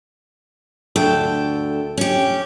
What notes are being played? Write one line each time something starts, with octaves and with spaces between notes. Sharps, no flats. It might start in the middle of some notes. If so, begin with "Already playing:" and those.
D2 A4 G5
C#4 G4